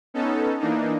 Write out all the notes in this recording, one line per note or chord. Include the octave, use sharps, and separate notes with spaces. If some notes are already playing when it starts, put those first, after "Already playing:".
B3 C#4 D#4 A4
E3 A#3 D4 D#4